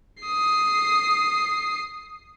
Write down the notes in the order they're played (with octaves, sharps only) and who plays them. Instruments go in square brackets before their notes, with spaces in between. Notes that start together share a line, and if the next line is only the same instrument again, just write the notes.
[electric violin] D#6 C7